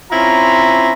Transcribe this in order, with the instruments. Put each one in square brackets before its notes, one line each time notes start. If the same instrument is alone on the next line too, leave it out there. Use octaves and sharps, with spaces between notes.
[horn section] C4 C#4 E4 F4 A#5